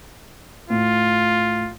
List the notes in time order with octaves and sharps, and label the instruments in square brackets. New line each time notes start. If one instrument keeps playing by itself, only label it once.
[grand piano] A2 [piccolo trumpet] F4